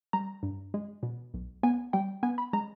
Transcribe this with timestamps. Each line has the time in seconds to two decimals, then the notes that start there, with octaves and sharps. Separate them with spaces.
0.13 G3 A#5
0.43 G2
0.74 G#3
1.03 B2
1.34 B1
1.63 B3 G#5
1.93 G3 G5
2.23 B3 G#5
2.38 B5
2.53 G#3 A#5